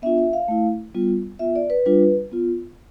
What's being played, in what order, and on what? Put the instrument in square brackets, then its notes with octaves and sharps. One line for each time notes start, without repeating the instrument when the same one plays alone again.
[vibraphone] B3 D4 F4 E5
E5
F5
A3 E4
G3 B3 F4
B3 F4 E5
D5
B4
G3 D4 F4 B4
B3 F4